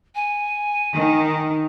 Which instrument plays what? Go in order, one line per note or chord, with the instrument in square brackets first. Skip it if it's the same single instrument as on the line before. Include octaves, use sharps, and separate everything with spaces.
[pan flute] G#5
[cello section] D#3